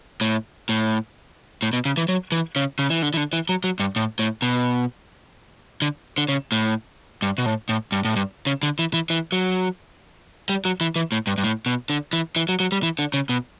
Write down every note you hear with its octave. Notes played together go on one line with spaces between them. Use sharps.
A2
A2
A2
B2
C#3
E3
F#3
E3
C#3
C#3
E3
D3
E3
D3
E3
F#3
F#3
G2
A2
A2
B2
D3
D3
C#3
A2
G2
B2
A2
A2
G2
A2
G2
C#3
D3
E3
E3
E3
F#3
G3
F#3
E3
E3
A2
G2
G2
A2
B2
D3
E3
E3
F#3
F#3
G3
E3
D3
C#3
B2